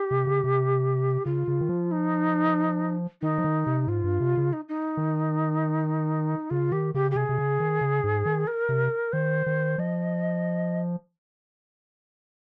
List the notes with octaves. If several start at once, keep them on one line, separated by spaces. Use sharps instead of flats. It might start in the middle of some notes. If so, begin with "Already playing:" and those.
Already playing: G4
C3
C#3
C3
C#3 F4
C#3
D#3
F3
D#4
D#3 D#4
F3
D#3
C3
G#2 F4
G2
C3
C#3
D#4
D#4
D#3
C#3 F4
D#3 G4
C#3 G4
G4
C3 G#4
C3
C#3
D#3
C#3
G#2
D#3
A#4
C3
D#3 C5
D#3
F3 D#5